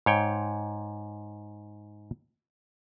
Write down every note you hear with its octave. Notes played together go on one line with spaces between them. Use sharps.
G#2 C#5 G5